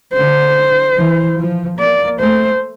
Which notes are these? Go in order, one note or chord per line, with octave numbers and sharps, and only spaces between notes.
D3 C5
E3
F3
A#3 D5
A3 C5